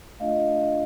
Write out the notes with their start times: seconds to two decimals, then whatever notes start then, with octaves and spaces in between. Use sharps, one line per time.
0.20 A3 D4 F4 D#5 F5